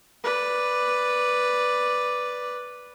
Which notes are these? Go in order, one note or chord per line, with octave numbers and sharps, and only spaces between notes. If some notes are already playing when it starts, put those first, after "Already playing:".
B4 D5